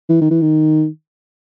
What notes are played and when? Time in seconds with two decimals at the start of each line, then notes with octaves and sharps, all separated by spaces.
0.09 E3
0.21 D#3
0.31 E3
0.41 D#3